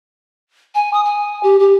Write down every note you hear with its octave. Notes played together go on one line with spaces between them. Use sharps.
G#5
D#6
G#5
G4
G4